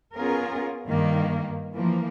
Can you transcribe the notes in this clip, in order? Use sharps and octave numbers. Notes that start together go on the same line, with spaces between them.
B3 C#4 F4 G#4 A#4
G2 D#3 A#3
E3 F3 A#3